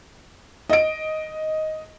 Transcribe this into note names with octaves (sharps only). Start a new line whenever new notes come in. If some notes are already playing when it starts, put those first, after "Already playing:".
D#5 D7